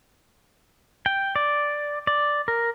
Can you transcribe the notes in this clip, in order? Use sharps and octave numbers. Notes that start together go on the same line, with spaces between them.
G5
D5
D5
A#4